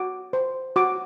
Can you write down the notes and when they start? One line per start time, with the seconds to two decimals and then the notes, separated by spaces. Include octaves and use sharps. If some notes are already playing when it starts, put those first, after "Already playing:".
Already playing: F#4 D6
0.33 C5
0.76 F#4 D6